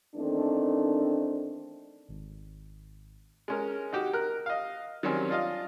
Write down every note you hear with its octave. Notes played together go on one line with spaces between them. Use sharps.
E2 D#3 A3 C4 D4
G#1
G#3 C#4 A#4
D#4 F#4 G4
A#4 F#6
D#5 F5
D#3 F#3 G3 C4 C#4
D4 F4 D#5 F5